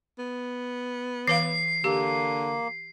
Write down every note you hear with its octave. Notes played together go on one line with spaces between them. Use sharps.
B3
E3 B4 F5 C7
D3 A#3 G4